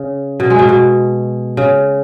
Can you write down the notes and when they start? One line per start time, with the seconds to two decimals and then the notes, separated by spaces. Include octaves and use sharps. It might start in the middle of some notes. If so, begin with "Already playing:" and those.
Already playing: C#3
0.40 B2
0.50 G#3
0.59 B2
0.69 B2
1.57 C#3